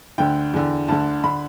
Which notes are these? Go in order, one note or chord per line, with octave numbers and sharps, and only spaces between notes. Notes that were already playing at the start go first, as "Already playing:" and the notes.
D2 D3 G5
E2 D3
D2 D3 A5
D3 B5